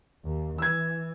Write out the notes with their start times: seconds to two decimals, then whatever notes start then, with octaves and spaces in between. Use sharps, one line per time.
0.25 D#2
0.58 E3 E6 G#6